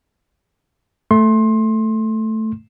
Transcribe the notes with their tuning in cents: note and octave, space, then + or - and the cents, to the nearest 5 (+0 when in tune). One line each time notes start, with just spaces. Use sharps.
A3 +0 C6 +25